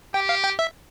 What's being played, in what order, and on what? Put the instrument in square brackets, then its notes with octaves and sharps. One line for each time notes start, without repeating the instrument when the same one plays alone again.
[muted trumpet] G4 [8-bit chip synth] G5
[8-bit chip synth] F5
G5
E5